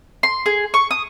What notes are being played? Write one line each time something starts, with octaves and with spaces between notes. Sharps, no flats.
C6
G#4
C#6
D#6